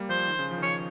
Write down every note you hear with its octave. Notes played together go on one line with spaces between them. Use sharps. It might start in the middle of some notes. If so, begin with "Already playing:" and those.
Already playing: G3 A#3
F3 C5
D#3
C#3
F3
D#3
F3 C#5